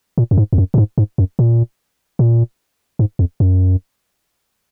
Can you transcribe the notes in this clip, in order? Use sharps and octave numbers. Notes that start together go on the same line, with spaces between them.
A#2
F#2
G#2
F2
F#2
A#2
G#2
G#2
F#2
A#2
A#2
G#2
F2
F#2